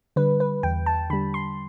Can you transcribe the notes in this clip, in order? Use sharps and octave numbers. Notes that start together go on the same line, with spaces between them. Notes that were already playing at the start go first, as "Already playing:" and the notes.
D3 G3 B4
B4
E2 G5
A5
D3 G3 B5
C6